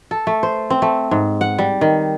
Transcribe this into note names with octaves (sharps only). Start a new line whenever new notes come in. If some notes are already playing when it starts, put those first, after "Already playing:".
A4
A3
C5
C4
A3
G#2
F#5
G3
D#3